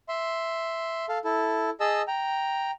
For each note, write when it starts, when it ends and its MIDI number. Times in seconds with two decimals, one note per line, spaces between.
0.09 1.06 76
0.09 1.06 84
1.09 1.18 69
1.09 1.18 77
1.25 1.70 64
1.25 1.70 69
1.80 2.02 68
1.80 2.02 75
1.80 2.02 81
1.80 2.02 88
2.08 2.71 79
2.08 2.71 82